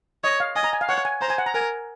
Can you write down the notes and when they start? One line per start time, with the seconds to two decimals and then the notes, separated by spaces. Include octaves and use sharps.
0.24 C#5 D#5
0.40 F5
0.56 D#5 G#5
0.64 A#5
0.73 G#5
0.81 F5
0.89 C#5 F#5
1.05 G#5
1.21 C5 A#5
1.30 G#5
1.38 F#5
1.46 A#5
1.54 A#4 G#5